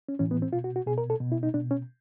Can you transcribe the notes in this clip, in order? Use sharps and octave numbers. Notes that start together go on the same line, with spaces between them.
C#4
A2 E3 C#4
B3
C4
B2 F4
F#4
F#4
B2 G#4
A#4
A4
B2
E4
D#4
B2 D4
C#4